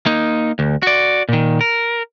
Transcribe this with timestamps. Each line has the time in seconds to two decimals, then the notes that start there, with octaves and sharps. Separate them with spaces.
0.06 A#3 D#4
0.59 D2
0.83 F#4 D5
1.29 A#2 D#3
1.61 A#4